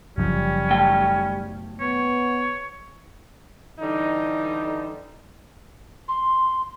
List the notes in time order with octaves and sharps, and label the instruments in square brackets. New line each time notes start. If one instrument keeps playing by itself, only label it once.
[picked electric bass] F#1 F#2 F3 [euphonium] G3 [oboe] C#4
[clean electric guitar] B1 A3 G5
[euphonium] B3 [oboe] C#5
[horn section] D3 E3 G3 D#4
[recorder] C6